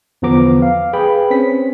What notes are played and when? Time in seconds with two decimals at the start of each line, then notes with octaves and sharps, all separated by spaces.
0.22 E2 D3 F3 B3 A#5 D6
0.62 F5
0.93 G#4 B4 G5 B5
1.31 C4 C#4 B6